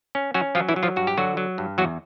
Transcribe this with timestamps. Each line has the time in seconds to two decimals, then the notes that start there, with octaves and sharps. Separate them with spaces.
0.15 C#4
0.34 F#3 C#4 F#4
0.55 F3 F#3 F4
0.69 E3 E4
0.76 F#3
0.83 F3 F4
0.96 G2 F#4
1.07 G4
1.17 D3 F#3 F#4
1.37 F#3
1.58 G2
1.78 E2 F#3 F#4